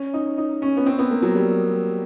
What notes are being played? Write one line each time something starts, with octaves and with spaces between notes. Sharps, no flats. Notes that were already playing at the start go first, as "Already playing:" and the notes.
Already playing: C#4
D#4
D#4
C#4
B3
C4
B3
A#3
F#3
G3